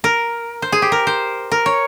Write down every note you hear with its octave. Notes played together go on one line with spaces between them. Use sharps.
A#4
C5
G#4
G4
A#4
C5
A#4
C#5